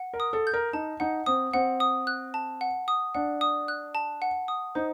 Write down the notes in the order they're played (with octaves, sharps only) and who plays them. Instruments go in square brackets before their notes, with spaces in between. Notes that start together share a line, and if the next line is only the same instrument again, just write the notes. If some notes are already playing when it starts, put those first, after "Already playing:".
Already playing: [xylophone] F#5
[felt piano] A#4
[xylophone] D#6
[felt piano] A4
[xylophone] G6
[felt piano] A#4
[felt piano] D#4 [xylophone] A5
[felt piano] D#4 [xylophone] F#5
[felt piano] C4 [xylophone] D#6
[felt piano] C4 [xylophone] F#5
[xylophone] D#6
F#6
A5
F#5
D#6
[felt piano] D4 [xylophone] F#5
[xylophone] D#6
F#6
A5
F#5
D#6
[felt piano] D#4 [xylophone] C5